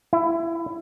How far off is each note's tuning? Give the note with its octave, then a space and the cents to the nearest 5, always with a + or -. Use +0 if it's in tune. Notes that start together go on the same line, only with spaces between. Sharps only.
E4 +20